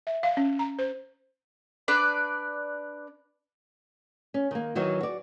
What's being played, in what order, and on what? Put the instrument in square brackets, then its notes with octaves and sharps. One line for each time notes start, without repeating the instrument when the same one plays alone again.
[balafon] E5
F5
C#4
A#5
C5
[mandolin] D4 B4 D5
[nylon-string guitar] C#4
D#3 A#3
D#3 E3 F#3 D#4 F#4
F#4 D5